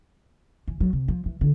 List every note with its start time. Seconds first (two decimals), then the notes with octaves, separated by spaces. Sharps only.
0.67 E3
0.80 F#3
0.93 C3
1.08 F3
1.26 E3
1.41 D3